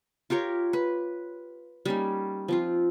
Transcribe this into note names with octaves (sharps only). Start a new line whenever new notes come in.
F4 G4 A#4 C#5
B4
G3 A#3 C#4 D#4
F3 C4 F4